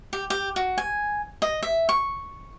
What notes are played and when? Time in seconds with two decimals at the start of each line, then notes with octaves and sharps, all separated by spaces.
0.13 G4
0.30 G4
0.56 F#4
0.78 G#5
1.42 D#5
1.63 E5
1.89 C#6